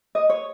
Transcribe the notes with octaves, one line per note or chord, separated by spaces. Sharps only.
D#5
C#5